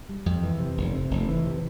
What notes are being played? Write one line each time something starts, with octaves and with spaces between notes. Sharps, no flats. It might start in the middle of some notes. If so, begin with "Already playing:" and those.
G3
F2
E3
C3
F1
C3
F1
E3
C3